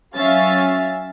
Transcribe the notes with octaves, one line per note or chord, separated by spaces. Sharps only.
F#3 C#4 E5 F5 A6